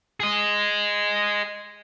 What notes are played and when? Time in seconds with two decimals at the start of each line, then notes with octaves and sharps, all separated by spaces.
0.20 G#4 D#5